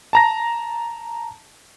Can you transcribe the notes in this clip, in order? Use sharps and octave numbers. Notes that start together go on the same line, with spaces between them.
A5 A#5 A#6